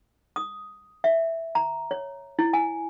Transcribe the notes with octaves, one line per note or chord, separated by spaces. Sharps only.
D#6
E5
A#5
C#5
E4
G#5